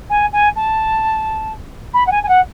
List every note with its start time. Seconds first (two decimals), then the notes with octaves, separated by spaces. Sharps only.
0.10 G#5
0.33 G#5
0.56 A5
1.94 B5
2.06 F#5
2.11 G#5
2.23 G#5
2.28 F#5